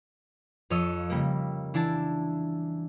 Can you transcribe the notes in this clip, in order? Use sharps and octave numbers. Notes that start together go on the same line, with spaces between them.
F2 F3 C#5 D#5 E6
C#3 G3 A#3
E3 D4 E4 A5